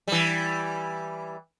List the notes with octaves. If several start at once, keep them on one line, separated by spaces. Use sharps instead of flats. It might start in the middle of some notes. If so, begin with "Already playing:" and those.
E3 G3